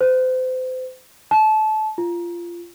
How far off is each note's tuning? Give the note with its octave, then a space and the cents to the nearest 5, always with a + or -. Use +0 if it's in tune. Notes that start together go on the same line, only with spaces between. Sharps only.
C5 -35
A5 -25
F4 -20